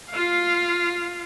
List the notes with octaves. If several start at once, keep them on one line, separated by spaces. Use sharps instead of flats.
F4 F5